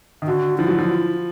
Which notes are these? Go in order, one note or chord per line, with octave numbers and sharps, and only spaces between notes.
D#3
D3 F#4
F3 E4
F#3
F3